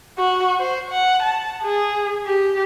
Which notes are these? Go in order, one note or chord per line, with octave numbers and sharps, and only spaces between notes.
F#4
C5
F#5
A5
G#4
G4